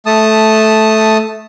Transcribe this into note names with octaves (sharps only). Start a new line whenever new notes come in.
A3 A5 D#6